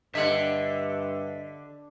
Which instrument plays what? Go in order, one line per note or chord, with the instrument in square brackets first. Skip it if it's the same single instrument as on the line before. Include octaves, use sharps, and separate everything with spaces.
[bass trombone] G2 [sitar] D3 [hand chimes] D#5 [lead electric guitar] E5 F#5